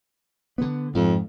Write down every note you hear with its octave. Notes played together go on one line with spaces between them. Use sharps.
D3 B3
F2 G#2